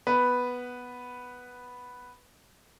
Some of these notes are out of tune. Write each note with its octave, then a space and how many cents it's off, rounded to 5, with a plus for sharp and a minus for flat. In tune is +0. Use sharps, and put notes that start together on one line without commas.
B3 +0 B4 +0